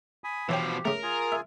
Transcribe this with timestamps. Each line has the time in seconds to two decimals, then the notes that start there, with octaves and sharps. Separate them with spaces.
0.24 G#5 B5 D#6
0.49 B2 E3 F3 G4 C#5 G5
0.85 C#3 A3 A#4
1.03 F4 G#4 G#5
1.32 E5